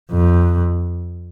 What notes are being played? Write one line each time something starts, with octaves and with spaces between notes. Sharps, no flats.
F2